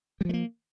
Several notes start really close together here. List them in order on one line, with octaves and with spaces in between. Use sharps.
G3 F3 A3 A#3